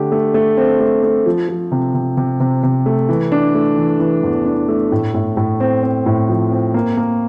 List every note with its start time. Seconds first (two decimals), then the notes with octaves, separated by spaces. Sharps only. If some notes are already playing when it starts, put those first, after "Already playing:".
Already playing: D3 A3 G4
0.12 A3
0.34 A3
0.57 C4
0.80 A3
1.03 A3
1.26 F3
1.48 F3
1.72 C3
1.94 C3
2.17 C3
2.40 C3
2.63 C3
2.86 A3
3.09 E3
3.32 D4
3.55 A3
3.78 E3
4.00 E3
4.23 E2
4.46 D4
4.68 A3
4.92 A2
5.14 A2
5.37 A2
5.60 C4
5.83 C4
6.06 A2
6.29 F3
6.51 C4
6.74 A#3
6.97 A#3